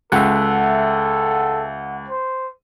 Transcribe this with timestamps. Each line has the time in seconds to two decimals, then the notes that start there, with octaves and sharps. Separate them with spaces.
0.12 C#2 A4 E5 F#5
2.08 C5